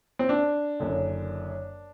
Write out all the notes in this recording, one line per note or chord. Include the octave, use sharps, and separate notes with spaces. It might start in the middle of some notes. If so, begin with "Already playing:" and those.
C4
D4
F#1 F#2 D3